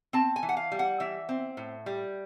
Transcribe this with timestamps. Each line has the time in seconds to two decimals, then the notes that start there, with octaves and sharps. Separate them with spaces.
0.13 C4 A5
0.36 G#5
0.43 E3
0.49 F#5
0.57 F5
0.72 G3
0.79 F#5
1.00 E3 E5
1.29 C4
1.57 A2
1.86 G3